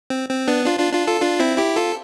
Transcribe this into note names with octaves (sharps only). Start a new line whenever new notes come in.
C4
C4
B3 D4
D4 F4
D4 F4
D4 F4
F4 A4
D4 F4
C4 E4
E4 G4
F4 A4